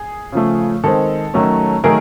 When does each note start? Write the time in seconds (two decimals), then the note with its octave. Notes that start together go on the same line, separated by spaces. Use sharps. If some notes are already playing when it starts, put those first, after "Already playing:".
Already playing: G#4
0.32 C#3 F3 A3
0.84 D#3 G#3 C4 A4
1.34 D#3 F#3 A3 C#4
1.84 D#3 F#3 A3 G#4 A#4